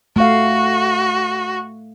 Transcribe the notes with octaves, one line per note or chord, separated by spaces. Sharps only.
A3 F#4 F5